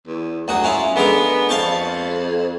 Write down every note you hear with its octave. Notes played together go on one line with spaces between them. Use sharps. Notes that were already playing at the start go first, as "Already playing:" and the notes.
E2
D2 F#3 F#4 D#6
C#4 E4 F4
D3 G#3 B3 A#4
F2 F5 A5 C#6